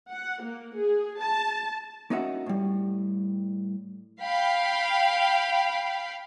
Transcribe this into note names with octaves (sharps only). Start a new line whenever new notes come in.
F#5
A#3
G#4
A5
A#3 C#4 D#4 F#4 E5 F#5
A2 G3
F5 G5 B5